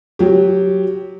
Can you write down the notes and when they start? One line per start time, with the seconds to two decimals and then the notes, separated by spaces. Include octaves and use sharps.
0.19 F#3 G4